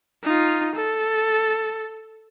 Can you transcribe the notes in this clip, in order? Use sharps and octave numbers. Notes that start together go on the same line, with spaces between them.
D#4 F4
A4